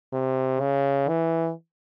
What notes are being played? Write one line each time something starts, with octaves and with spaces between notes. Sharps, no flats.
C3
C#3
E3